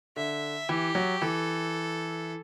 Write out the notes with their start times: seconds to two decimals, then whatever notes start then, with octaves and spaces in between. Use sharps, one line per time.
0.16 D3 E5
0.68 E3 G4
0.95 F#3
1.21 E3 A4